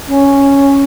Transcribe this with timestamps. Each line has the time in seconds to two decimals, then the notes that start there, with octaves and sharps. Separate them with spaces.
0.07 C#4